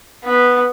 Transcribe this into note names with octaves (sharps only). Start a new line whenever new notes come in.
B3